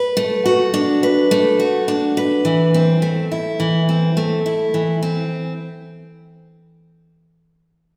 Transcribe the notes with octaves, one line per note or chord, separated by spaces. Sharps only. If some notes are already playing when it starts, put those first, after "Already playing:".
Already playing: B4
A3
F#4
D4
B4
A3
F#4
D4
B4
E3
C4
A3
E4
E3
C4
A3
E4
E3
C4